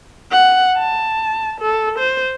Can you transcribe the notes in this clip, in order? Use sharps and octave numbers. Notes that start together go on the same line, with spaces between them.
F#5
A5
A4
C5